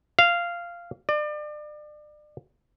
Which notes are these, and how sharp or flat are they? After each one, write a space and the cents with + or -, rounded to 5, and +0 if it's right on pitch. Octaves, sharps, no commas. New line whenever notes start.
F5 -10
D5 +35